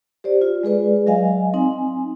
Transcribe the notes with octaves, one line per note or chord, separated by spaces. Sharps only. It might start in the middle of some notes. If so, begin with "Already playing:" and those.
G4 C5 D5
F4
G#3 G#4 B4 D5
F#3 D#5 F5 G#5
C4 D#4 G#5